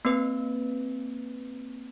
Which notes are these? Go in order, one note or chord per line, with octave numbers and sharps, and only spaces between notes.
A#3 C4 B4